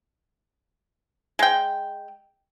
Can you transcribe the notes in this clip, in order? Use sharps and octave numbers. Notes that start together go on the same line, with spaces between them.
G#3 G5